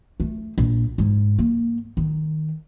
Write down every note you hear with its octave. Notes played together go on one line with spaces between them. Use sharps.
A3
A#1
G#2
A#3
D#3